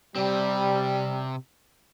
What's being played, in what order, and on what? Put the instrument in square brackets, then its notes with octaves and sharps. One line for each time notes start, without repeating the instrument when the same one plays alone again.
[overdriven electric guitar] C3 C4 [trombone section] G3